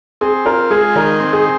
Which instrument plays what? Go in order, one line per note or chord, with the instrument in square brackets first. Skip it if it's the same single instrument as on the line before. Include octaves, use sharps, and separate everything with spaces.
[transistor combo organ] C4 [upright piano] G#4
[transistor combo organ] F4 [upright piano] A#4
[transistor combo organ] G#3 [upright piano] G#4
[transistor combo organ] D#3 [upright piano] A#4
[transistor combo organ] C4
[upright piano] G#4